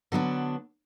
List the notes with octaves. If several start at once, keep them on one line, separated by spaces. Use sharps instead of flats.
D3 F#3 B3 D4